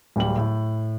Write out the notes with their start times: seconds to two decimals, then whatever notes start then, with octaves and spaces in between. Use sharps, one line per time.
0.16 D1 G3 F#7
0.38 A2